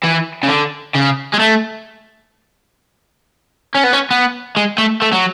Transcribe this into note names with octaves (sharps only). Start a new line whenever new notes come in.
E3
C#3
D3
C#3
G#3
A3
C#4
B3
C#4
B3
G#3
A3
A3
F#3